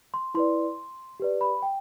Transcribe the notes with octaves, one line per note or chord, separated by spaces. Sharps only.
C6
E4 B4 D5 C6
G4 B4 D5
B5
G5